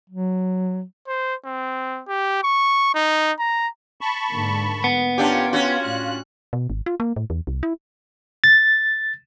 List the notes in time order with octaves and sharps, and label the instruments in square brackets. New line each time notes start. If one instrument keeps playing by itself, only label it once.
[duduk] F#3
[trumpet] C5
C4
G4
C#6
D#4
A#5
[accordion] A5 B5 C#6
[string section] G#2 D3 A#3
[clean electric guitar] B3
[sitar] C#4 D4 G4 [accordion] F4 [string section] A#4 G5
[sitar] C#4 F#4
[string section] A2 D4 F#6
[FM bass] B2
G#1
F4
A#3
A2
E2
C2
E4
[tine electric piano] A6